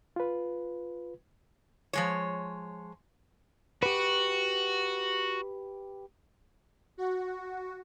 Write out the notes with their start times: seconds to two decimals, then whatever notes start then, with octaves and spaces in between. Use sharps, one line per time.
0.16 F4 B4
1.93 F3 G#3 C#5
3.83 F#4 G4 B4
6.98 F#4